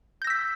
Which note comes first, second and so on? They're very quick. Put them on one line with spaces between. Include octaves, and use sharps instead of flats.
G6 A#6 E6 B6